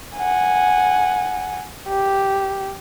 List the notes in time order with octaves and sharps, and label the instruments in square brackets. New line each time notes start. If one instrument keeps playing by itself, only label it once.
[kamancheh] F#5 G#5
G4